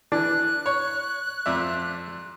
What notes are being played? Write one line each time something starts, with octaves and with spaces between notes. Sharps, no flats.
E3 D4 F#6
C#5
F2 D5 E5